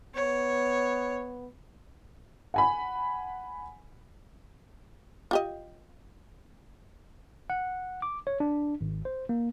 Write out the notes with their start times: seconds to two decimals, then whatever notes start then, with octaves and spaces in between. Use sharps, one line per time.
0.14 B3 C#5
2.54 F#5 G#5 B5
5.31 F4 G4 D#5
7.50 F#5
8.02 D6
8.27 C#5
8.40 D4
8.81 G#1
9.05 C5
9.29 A#3